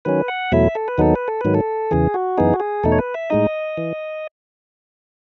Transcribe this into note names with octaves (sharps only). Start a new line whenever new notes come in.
D#3 F#3 C#4 B4
F#5
E2 B2 F#3 A3 E4 E5
A4
B4
D#2 D#3 F#3 B3 D#4 A4
B4
A4
G#2 D#3 F#3 B4
A4
E2 C#3 E3 G#4
F#4
F#2 E3 B3 D#4 G#4
F#4
G#4
E2 B2 A3 D#4 A4
C#5
B4
E5
A2 G#3 D#4 D#5
E3